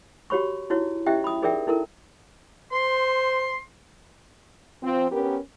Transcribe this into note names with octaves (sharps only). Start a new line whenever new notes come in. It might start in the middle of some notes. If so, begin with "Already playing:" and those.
F#4 G4 C#5 B5 C#6
D#4 E4 F#4 C#5
C#4 E4 G4 D#5 E5 G5
B5 D#6
D#4 G#4 A#4 D5 E5 G5
D#4 E4 A4 A#4
C5 C6
F3 C4
B3 C#4 G4 A#4